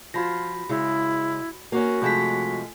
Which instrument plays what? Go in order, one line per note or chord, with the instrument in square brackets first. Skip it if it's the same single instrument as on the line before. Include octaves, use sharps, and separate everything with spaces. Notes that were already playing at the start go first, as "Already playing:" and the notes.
[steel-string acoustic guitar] F3 [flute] F4 [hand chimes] F#4 B5 A#6
[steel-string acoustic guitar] C#3 G#3 [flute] E4
[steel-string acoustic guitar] A#3 C#4 [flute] F#4
[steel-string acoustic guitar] C3 F3 G#3 [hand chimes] A3 G#5 B6